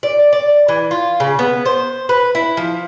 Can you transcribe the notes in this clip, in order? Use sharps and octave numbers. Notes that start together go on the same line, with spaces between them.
D5
D5
E3
F4
C#3
B3
C5
B4
E4
F3